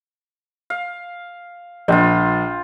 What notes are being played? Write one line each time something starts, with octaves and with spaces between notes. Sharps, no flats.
F5
A#1 C4 F4